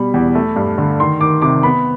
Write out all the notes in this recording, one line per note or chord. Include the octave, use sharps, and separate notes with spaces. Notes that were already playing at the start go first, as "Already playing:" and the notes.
Already playing: B2 G3 B5
E2
A3
G2
D3
D#3 C6
D#3 D6
C3 D6
B3 B5